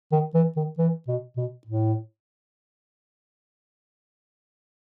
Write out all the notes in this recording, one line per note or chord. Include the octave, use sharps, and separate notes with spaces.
D#3
E3
D#3
E3
B2
B2
A2